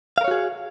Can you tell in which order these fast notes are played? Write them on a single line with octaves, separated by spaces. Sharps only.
F5 A#4 C#5 F#4 G#4